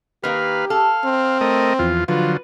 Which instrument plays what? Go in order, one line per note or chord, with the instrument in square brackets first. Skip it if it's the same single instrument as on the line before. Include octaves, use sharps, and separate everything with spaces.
[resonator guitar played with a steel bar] D#3 A#3 [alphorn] G4 [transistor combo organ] B4 F5
[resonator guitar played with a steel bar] A4 [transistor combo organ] F5
[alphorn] C4
[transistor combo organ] A3 A#4 D#5
E2 F3 F4
[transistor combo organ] D3 F3 F#3 [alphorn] F4 [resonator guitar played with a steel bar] B4